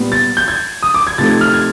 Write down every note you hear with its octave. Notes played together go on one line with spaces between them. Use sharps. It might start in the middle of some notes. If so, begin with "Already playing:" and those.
Already playing: A#2 G3 B3
A6
G6
G#6
D#6
D6
G#6
C3 F3 A3 C4 D#4 A6
G#6
F6
G#6